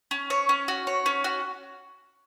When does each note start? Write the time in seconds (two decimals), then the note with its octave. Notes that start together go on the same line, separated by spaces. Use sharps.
0.11 C#4
0.30 C#5
0.49 C#4
0.68 F#4
0.87 C#5
1.06 C#4
1.24 F#4